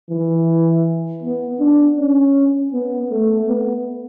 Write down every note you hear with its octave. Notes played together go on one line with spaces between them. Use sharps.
E3
B3
D4
C#4
B3
A3
B3